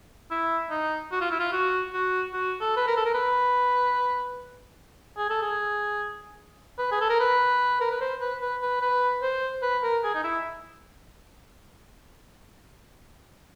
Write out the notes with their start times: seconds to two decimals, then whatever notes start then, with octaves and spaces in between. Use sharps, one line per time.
0.31 E4
0.70 D#4
1.12 F#4
1.21 F4
1.31 E4
1.40 F4
1.52 F#4
1.93 F#4
2.34 F#4
2.61 A4
2.76 B4
2.87 A#4
2.97 A4
3.05 A#4
3.14 B4
5.18 G#4
5.30 A4
5.42 G#4
6.78 B4
6.92 G#4
7.01 A4
7.09 A#4
7.20 B4
7.81 A#4
7.91 B4
8.01 C5
8.21 B4
8.41 B4
8.62 B4
8.81 B4
9.22 C5
9.62 B4
9.83 A#4
10.04 G#4
10.15 D#4
10.24 E4